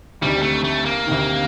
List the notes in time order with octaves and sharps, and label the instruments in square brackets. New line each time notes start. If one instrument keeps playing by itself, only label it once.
[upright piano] D2 C3 D#3 [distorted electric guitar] G3
[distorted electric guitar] A3
A3
A#3
[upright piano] D2 C3 D#3